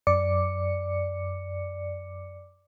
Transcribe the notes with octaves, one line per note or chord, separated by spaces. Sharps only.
F#2 D5 D6 C#7